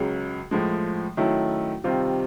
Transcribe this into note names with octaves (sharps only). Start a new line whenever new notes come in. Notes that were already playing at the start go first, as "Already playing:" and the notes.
Already playing: C#2 C#3 F#3
A2 F3 G#3
D#3 F#3 A3 C#4 E4
C3 D#3 G3 C4 F4